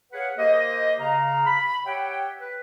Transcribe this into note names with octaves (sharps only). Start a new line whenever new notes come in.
G#4 B4 C#5 F5 F#5
A#3 G4 A#4 C5 D#5
C#3 F5 A#5
B5
G4 C#5 E5 F#5 G5
B4